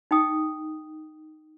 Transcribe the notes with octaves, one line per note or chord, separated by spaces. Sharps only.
D#4 G5 D#6